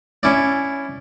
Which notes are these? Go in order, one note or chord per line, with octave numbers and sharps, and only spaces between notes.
C#4 E4 D5